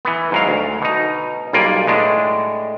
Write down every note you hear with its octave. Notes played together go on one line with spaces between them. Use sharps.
E3 B3
G#2 F#3 F5
D2
B2 D#4
B1 G3 A#3 F4 D5 G#5
A2 G#3 D4